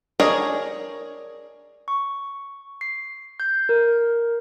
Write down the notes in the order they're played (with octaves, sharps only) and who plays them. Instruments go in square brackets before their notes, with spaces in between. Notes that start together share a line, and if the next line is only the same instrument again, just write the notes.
[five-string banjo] D4 G#4 A#4 C#5 D#5
[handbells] C#6
C7
G6
A#4